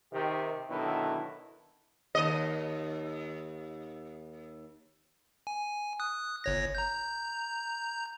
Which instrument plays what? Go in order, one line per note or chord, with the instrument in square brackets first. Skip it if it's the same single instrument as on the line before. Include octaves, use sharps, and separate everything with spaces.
[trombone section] C3 D#3 G4
B2 D3 D#3 F#3 E4 A4
[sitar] D#2 D#5
[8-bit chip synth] G#5
D#6 F#6
G1 C#5 A#6
A#5 G6